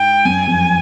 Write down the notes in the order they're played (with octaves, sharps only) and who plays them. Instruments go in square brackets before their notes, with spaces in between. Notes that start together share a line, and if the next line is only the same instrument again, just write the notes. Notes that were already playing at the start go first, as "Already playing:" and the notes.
Already playing: [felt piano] G#2 [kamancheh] G5
[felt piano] F#2 [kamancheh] G#5
[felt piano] F2